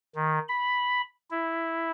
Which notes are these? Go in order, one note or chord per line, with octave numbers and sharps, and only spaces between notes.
D#3
B5
E4